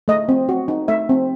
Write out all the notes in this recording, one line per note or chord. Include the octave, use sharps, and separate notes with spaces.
A3 D#5
C4
F#4
D#4
A3 E5
C4